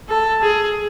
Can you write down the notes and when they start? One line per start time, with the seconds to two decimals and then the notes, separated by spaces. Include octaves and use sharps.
0.09 A4
0.42 G#4